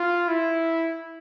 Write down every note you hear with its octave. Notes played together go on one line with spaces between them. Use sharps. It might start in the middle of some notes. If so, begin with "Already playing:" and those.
Already playing: F4
E4